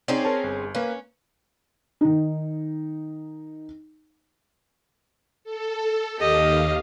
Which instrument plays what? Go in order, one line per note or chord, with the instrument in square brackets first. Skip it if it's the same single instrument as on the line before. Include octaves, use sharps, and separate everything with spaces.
[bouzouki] C4 C#4 G#4 [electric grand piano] D#4 C5 D5
[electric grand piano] A#4 C#5 A5
G1
[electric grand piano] A#3 B4 F5 [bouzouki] C#4
[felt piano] D#3 D#4
[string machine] A4
[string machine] D#2 F5 [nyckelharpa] G4 D#5